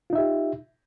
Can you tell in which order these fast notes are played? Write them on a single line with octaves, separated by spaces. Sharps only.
F4 D#4 E5 G4